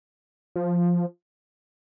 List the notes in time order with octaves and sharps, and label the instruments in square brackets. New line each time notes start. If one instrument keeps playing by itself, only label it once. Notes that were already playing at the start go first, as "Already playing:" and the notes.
[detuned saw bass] F3